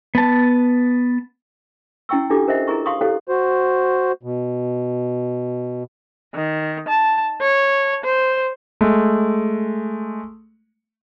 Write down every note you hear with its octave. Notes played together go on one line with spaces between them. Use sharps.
B3 A5
C#4 E4 F#5 G5 C#6 E6
D4 E4 F4 G4 A4 D6
G4 A#4 C5 D#5 E5 F#5
E4 G#4 A#4 A#5 C#6
F5 F#5 C6 C#6 D#6
E4 G4 A4 C#5 F5 F#5
F#4 C5
B2
D#3
A5
C#5
C5
G#3 A3